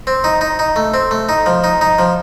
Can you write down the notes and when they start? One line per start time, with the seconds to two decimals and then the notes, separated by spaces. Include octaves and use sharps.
0.07 C4
0.24 D#4
0.41 D#4
0.59 D#4
0.76 A3
0.94 C4
1.11 A3
1.29 D#4
1.46 F3
1.64 D#4
1.81 D#4
1.99 F3